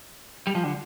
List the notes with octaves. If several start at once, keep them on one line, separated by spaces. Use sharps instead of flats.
G3
F3
D3